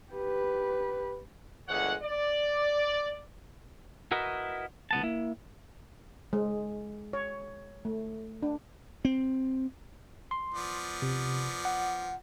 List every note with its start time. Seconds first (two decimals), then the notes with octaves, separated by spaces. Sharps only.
0.12 G4 B4
1.69 G1 D2 G#3 C#5 F#5
2.02 D5
4.11 E4 F#4 A#4 B4 D#5
4.91 C#2 B3 A5
5.03 A#3 E4
6.33 G#3
7.13 C#5
7.85 A3
8.43 D4
9.05 C4
10.31 C6
10.54 F3 B3 D5
11.02 C3
11.65 F#5